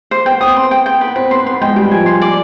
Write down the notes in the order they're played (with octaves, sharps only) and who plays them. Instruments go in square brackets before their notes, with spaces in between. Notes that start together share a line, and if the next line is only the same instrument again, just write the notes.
[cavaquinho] C5
[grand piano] B3 [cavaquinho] G5
[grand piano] C4 [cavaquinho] D#6
[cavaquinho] C6
G5
G5
[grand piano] B3 [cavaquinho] B4
[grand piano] C4 [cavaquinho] B4
[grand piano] B3 [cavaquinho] C6
[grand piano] B3 [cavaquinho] C6
[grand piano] G#3 [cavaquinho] G5
[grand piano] G3 [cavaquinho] G5
[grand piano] F3 [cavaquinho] G#5
[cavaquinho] C6
D5